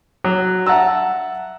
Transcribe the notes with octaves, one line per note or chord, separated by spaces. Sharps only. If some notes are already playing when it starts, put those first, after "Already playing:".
F#3
E5 F#5 A5 A#5 E6